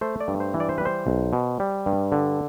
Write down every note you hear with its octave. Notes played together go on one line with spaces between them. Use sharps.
A3 C5
D5
G2
C5
E3
D5
C5
G3 B4
C5
B1
B2
G3
G2
D3